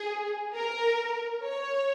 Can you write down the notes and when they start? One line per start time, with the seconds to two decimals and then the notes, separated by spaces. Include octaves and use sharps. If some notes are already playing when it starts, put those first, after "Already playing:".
Already playing: G#4
0.54 A#4
1.44 C#5